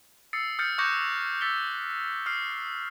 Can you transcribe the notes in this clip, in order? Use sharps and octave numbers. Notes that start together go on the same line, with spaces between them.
D#6 E6 A6 C7 C#7
D#6 F6 G6 A6 C#7
C#6 D6 F#6 G6 A#6 C#7
E6 A6 B6 C#7 G7
D#6 F6 C7